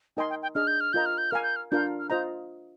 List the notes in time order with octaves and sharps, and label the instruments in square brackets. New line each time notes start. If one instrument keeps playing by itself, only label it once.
[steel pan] D#4 A#4 D#5 G#5 C6 [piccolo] G5
[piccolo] G5
G5
[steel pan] D4 G#4 D#5 [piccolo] F6
[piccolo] G6
F6
[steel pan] F4 A#4 D#5 A#5 [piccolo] G6
[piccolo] F6
G6
[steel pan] A#4 F5 G#5 [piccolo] F6
[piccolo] G6
F6
[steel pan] D4 F4 A#4 F5 [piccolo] G6
[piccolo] F6
[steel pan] F4 C5 D#5 A#5 [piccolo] G6